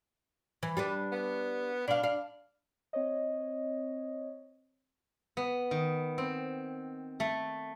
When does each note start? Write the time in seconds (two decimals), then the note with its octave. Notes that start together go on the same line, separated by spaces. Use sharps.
0.63 E3
0.77 G3 D4 B4
1.12 B3
1.88 B2 D4 F5
2.03 D4 F5
2.93 C4 C#5 D#5
5.37 B3
5.71 D#3
6.18 C4
7.20 A3